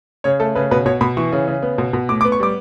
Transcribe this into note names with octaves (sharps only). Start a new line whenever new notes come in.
C#3 C#5
A3 A4
C#3 B4
B2 B4
B2 C#5
B2 B5
E3 C#6
C#3
C#3
B3
B2
B2
A2 D6
D6
B3
C#6
G3 D6